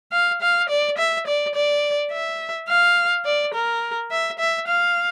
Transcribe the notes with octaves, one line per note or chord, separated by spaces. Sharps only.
F5
F5
D5
E5
D5
D5
E5
F5
D5
A#4
E5
E5
F5